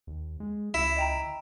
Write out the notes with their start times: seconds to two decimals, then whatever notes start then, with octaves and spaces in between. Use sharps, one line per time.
0.07 D#2
0.40 G#3
0.74 C#2 E4
0.96 D#5 G5 A#5